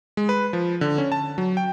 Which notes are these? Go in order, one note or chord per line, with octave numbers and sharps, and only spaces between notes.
G#3
B4
F3
D3
C#4
A5
F#3
G5